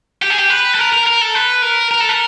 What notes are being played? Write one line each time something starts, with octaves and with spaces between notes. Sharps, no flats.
G4
G#4
G4
B4
A4
A#4
A#4
A#4
A4
B4
A#4
A#4
A4
A#4